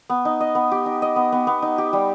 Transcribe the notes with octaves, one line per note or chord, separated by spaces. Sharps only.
B3
D#4
D#5
B3
G4
D#4
D#5
B3
B3
B3
D#4
G4
G3